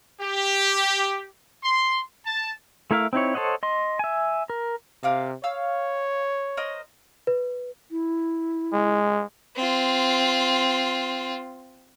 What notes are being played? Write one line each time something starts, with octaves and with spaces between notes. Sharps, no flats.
G4
C6
A5
A3 E4 A#4 E5 F5
C4 D#4 E4 C#5
A4 C5 C#5 D#5 F#5
D#5 C6
E5 G#5
A#4
C3 A#4 F5 D6
C#5 F5 E6 F6
A#4 C5 D#5
B4
E4
G#3
C4 F4